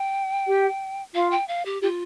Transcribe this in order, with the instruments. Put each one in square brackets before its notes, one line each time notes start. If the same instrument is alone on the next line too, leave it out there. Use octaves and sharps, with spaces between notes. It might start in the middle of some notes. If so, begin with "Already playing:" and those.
Already playing: [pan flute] G5
[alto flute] G4
[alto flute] F4 [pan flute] F5
[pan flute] G5
F5
G4
[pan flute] F4 [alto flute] G4